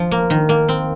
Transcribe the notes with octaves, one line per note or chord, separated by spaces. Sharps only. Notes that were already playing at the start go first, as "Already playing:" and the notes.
Already playing: F3
A#3
D#3
A#3
C4